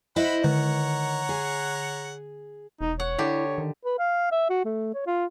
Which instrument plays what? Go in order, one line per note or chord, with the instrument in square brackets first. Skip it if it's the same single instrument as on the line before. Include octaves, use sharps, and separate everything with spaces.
[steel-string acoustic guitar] E4 C5 D#5 [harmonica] F#5 B5
[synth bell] D3 [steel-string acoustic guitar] D#3 [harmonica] C#5 F#5 A#5
[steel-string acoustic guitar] G#4
[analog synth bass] E1 [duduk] D#4
[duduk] C#5 [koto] F#5
[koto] D3 G4 [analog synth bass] E4
[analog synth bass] D#3
[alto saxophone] B4
F5
E5
F#4
A3
C#5
F4